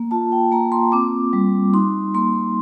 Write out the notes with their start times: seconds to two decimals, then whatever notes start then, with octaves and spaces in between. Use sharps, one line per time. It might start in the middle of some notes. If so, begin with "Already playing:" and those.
Already playing: A#3
0.11 F4 A5
0.32 G5
0.51 A#3 A#5
0.72 C6
0.92 C4 D6
1.33 G3
1.73 D#4 C6
2.14 A#3 C6